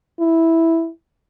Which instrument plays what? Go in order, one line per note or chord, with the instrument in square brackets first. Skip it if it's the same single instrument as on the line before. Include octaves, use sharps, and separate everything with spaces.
[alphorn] E4